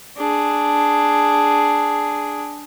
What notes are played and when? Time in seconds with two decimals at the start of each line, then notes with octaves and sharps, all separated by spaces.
0.17 D4 G#4